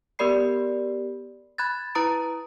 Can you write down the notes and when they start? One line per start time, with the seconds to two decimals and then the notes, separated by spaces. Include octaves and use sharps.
0.19 B3 G4 A#4 D5 B5 C7
1.58 B5 F#6 G#6 A6
1.95 E4 B4 A#5 D#6 D7